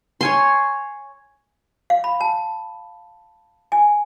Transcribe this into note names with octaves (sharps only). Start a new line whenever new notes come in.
C#5 G#5 C6
F5
B5
A5
G#5